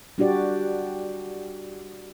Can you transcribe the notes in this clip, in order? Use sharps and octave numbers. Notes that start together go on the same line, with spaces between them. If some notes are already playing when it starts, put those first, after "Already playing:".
G3 D4 F#4 G4 D5